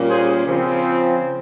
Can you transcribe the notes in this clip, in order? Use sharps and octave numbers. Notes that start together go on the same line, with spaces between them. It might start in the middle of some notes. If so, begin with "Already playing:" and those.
Already playing: A#2 G3 A#3 C#4
G#4 C5
C#3 F3 C4